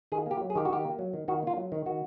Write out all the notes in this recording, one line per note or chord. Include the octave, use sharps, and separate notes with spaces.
D#3 G#4
A#3 G4
F#3
G#4
D#3 G4
F#4
D#3 G4
A#3
F#3
D#3
D#3 F#4
A#3 F4
F#3
D#3
D#3 F#4